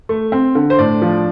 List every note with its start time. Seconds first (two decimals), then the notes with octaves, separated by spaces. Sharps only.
0.09 A3
0.32 C4
0.55 D3
0.70 C5
0.79 A2 D4 D5
1.02 F3